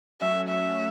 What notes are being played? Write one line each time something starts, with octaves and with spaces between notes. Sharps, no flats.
F#3 A3 C#4 F#4 E5
E5